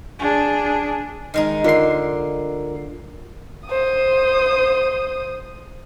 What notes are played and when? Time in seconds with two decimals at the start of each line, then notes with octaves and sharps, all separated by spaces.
0.19 D4 G#4
1.34 D#3 G#3 D#4
1.64 D3 F4 A#4 C6 C7
3.67 C5 D#6